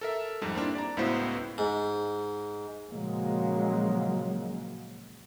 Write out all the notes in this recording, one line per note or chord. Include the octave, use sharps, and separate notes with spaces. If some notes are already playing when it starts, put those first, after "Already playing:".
A4 A#4 E5
F2 G#2 G3
A#3 C4 D4 E4
D5 A#5
C#2 A2 B3 E4 F#4 C5
G#2
A#2 C#3 F3 F#3 G#3 A#3